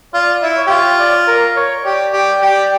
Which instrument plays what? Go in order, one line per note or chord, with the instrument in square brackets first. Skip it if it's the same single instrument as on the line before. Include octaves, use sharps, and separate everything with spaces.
[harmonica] F4 [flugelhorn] D5
[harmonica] E4
[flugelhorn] C#5
[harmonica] G4
F4
[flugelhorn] D5
A#4
C#5
[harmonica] G4 [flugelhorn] D5
[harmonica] G4
G4